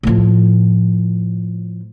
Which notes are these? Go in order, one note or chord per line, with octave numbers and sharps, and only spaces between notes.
A2 F3